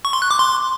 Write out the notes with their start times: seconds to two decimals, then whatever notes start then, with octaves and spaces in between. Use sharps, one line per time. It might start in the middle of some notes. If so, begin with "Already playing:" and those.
0.05 C#6
0.13 C6
0.22 F#6
0.31 D6
0.39 C6